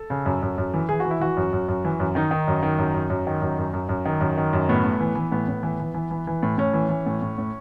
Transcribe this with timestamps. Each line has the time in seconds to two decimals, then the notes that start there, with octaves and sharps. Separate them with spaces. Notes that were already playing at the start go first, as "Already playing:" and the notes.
Already playing: A4
0.10 C#3
0.26 F#2
0.42 F#2
0.58 F#2
0.74 E3
0.89 E3 G#4
1.00 F#4
1.05 E3
1.11 E4
1.20 E3 F#4
1.37 F#2
1.53 F#2
1.68 F#2
1.85 E3
2.00 F#2
2.15 D#3 D#4
2.31 D#3
2.48 F#2
2.63 D#3
2.78 F#2
2.94 F#2
3.10 F#2
3.27 D#3
3.42 F#2
3.58 F#2
3.73 F#2
3.89 F#2
4.05 D#3
4.21 F#2
4.38 D#3
4.53 F#2
4.69 A2 B3
4.84 A2
5.00 E3
5.15 E3
5.32 A2 B3
5.48 A2
5.63 E3
5.80 E3
5.94 E3
6.11 E3
6.27 E3
6.43 A2
6.58 A2 C#4
6.73 E3
6.89 E3
7.06 A2
7.22 A2
7.38 A2